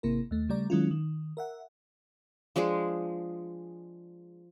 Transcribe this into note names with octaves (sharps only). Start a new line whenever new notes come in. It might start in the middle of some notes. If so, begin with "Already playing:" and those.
G#1 C3 A#3 E4 A#4
D#2 A3
C#3 G3 A3 D5 A#5
D#3 F#3 G#3 C#4 E4 F4
D#3
A#4 E5 F#5
F3 G#3 D4 G#4